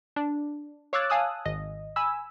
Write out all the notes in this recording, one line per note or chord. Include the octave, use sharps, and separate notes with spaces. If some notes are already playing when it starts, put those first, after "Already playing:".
D4
C#5 F5 D6 E6 F#6 A6
F5 G#5 A5 D#6 E6 F#6
G#1 D#5
G#5 B5 E6